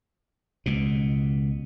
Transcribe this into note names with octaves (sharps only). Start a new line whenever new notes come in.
C#2 B2